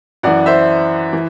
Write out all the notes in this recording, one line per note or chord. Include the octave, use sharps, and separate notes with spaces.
F#2 E3 D5 F#5
C5 E5
E3